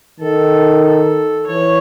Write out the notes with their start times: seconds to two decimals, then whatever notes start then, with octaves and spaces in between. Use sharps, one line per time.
0.20 D#3 A4
0.85 A4
1.48 E3 C#5